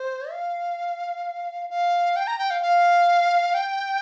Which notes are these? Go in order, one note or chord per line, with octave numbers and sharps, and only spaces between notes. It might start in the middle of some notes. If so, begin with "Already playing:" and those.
Already playing: C5
F5
F5
G5
A#5
G5
F5
F5
G5